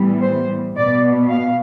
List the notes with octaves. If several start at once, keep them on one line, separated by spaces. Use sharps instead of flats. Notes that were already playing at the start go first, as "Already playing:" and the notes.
Already playing: A2 E3 G3 B3
C5
B2 B3 D5
F5